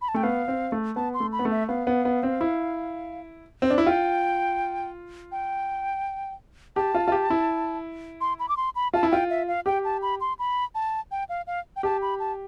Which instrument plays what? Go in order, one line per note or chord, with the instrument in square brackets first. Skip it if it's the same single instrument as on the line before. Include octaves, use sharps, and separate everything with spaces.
[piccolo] B5
A5
[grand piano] A3 [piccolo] G5
[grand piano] B3 [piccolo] F5
[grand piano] C4
A3
[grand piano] B3 [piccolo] A5
[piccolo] C6
[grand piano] A3
[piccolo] B5
[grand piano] B3
A3
[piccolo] E5
[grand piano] B3 [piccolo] F5
[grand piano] B3
B3
C4
E4
C4
D4
E4
[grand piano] F4 [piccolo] G5
[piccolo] G5
[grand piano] G4 [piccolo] A5
[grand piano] F4
F4
G4
E4
[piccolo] C6
B5
D6
C6
B5
[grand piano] F4 [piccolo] A5
[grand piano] E4
[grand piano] F4 [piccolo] G5
[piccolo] E5
F5
[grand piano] G4 [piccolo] G5
[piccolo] A5
B5
C6
B5
A5
G5
F5
F5
G5
[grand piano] G4 [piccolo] A5
[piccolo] B5
A5